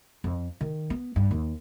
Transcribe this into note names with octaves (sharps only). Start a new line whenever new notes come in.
F2
D#3
B3
G2
D#2